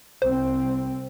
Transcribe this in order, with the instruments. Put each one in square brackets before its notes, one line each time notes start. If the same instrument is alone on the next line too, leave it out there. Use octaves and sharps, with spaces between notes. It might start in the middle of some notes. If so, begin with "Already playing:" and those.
[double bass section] C2 C4 [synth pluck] C5